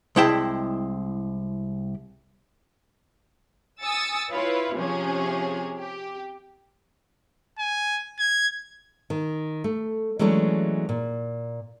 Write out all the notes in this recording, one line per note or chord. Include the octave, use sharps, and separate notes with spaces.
C2 G#3 E4 G5 A5
G#5 D#6 E6 A6 C#7
E4 F4 B4 C#5
C3 F3 C#4 G#4
G4
G#5
G#6
D#3
A3
E3 F#3 G#3 A3 C#4 D4
A#2